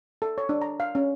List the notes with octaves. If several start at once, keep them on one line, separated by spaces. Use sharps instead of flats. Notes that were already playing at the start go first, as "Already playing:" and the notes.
A4
C#5
D4
A#5
F5
C#4